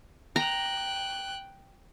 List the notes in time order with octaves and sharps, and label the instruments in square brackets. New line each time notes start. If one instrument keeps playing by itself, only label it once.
[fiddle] G5 F#6 [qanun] A#5